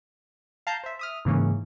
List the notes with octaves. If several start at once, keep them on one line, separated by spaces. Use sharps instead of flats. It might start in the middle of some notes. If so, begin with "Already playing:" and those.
F5 A5 A#5 G6
C5 E5
E5 D#6 F6
G#2 C#3 E3 A#3 C#4